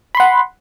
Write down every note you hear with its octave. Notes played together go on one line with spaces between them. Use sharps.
F#5 B5 C6